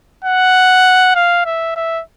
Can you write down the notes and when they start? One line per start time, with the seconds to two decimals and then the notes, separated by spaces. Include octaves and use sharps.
0.25 F#5
1.15 F5
1.46 E5
1.76 E5